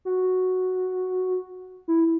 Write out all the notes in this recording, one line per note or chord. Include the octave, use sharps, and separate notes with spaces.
F#4
E4